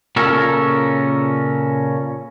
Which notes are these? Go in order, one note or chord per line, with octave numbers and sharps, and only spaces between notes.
A#2 C#3 C#4 A4 A#4